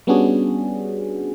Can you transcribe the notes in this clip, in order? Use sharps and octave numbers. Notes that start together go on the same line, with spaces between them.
G3 B3 C#4 D4 F#4 G#4